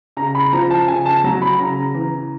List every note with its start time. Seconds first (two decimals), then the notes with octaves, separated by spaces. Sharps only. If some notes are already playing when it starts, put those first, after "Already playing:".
0.17 C#3 A#5
0.35 B5
0.53 F3 A#5
0.70 A5
0.88 C#3 G#5
1.06 A5
1.24 F#3 A#5
1.42 B5
1.59 C#3 A#5
1.94 E3